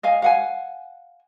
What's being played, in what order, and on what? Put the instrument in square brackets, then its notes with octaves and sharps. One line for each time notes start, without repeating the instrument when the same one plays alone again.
[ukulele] D#5 F5 G#5
F5 F#5 G#5